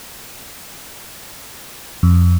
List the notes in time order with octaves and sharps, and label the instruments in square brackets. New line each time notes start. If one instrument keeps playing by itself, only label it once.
[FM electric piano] F2